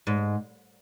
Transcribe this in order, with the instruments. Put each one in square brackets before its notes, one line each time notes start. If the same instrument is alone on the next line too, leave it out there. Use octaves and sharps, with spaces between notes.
[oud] G#2